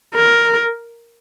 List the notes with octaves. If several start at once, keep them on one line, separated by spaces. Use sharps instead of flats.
A#4